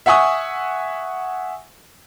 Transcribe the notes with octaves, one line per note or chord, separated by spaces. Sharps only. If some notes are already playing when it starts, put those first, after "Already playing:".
E5 F#5 G#5 C#6 D#6